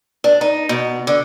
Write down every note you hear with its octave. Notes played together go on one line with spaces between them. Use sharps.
D4
D#4
B2
D3